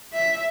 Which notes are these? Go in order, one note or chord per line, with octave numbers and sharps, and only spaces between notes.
E5